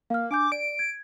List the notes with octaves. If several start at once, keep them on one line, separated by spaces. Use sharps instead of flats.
A#3 F5 F6
D4 G#5 D6 G6
D5 D7
G#6